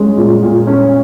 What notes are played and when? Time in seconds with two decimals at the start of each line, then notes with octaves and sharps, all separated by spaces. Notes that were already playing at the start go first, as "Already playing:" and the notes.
Already playing: G#3 C#4
0.17 A#2
0.43 A#2
0.67 C#4